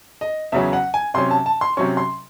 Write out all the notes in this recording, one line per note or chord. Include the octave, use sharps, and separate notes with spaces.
D#5
E2 C#3 F#3 C#4 E5
F#5
G#5
C3 F#3 C#4 C6
A5
A5
C6
C3 F#3 C#4 C#6
C6